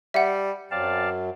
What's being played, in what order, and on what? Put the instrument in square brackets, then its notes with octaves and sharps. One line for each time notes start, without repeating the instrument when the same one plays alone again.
[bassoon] G3 [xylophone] E5 F#5
[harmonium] F#2 F#3 [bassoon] C4 [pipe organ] D5 F5 A5